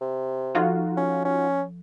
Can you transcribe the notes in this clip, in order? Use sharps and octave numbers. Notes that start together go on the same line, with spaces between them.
C3
F3 D#4 F4 F#4 A4 F#5
C#4
C#4